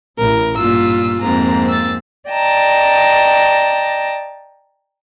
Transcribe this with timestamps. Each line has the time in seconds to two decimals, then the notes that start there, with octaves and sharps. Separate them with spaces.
0.18 A1 A2 A#4
0.58 G2 A#2 A#3 F4 E6
1.22 F2 G#2 A#3 C4 A#5
1.68 E6 A6
2.29 D5 D#5 G5 A5 A#5